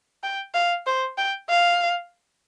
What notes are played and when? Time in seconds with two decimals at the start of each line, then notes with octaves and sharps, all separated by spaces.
0.23 G5
0.55 F5
0.87 C5
1.18 G5
1.49 F5